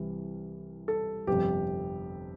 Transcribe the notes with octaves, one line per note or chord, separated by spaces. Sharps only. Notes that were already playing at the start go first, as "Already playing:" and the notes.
Already playing: C2 C3 E3
A4
G1 F2 C3 G4